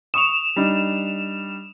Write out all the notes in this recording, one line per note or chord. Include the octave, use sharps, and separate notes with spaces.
C#6 D#6 E7 F7
G3 D4 D#4